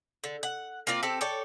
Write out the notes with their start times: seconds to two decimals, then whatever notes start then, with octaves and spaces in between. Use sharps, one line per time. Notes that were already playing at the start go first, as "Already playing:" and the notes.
0.24 D3
0.43 F#5
0.87 A#3 C4 F4 D5
1.03 C4 G4 A4
1.21 A4 C#5 D5 G5